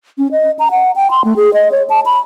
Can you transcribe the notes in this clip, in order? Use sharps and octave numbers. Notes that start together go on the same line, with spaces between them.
C#4
D#5
A#5
F#5
G5
C6
A3
G#4
D#5
C#5
A5
B5